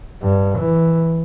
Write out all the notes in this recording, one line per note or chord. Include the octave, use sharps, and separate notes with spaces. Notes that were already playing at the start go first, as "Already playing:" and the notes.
G2
E3